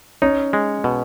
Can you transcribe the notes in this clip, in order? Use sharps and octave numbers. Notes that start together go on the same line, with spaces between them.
C#4 D#4 C#5
G#3
B2